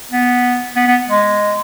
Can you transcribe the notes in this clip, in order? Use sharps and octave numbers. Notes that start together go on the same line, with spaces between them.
B3
B3
B3
G#3